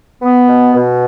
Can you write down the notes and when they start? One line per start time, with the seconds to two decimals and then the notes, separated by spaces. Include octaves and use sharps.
0.21 B3
0.48 B2
0.74 B2